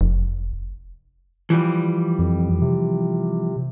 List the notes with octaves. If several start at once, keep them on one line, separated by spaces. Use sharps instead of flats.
F1
E3 F3 G3
F2
C3